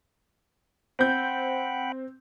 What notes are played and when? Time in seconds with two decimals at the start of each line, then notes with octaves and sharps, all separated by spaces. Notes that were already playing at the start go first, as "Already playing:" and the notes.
0.99 C4 F#5 G5 B5 G6